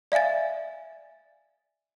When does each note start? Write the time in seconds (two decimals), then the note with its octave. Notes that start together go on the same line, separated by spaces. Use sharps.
0.12 D5 E5 F5 G#5 A6